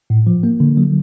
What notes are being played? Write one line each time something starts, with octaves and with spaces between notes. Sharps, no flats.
A2
F3
A#3
D3
F#3